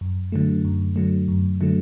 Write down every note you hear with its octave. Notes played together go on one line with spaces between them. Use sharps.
F#2
D3 F#3 A3
F#2
D3 F#3 A3
F#2
D3 F#3 A3